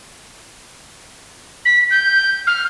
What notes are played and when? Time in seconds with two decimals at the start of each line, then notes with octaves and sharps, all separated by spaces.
1.65 B6
1.91 G6
2.47 F6